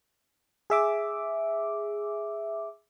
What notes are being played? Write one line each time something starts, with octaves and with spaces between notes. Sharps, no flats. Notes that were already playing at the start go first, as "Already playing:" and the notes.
G#4 E5 D6